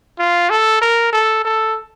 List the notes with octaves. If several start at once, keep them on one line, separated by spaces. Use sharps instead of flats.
F4
A4
A#4
A4
A4